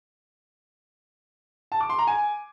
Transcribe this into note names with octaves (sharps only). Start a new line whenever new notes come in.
A5
D6
C6
A#5
G#5